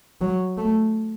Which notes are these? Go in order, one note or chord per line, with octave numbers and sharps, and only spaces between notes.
F#3
A3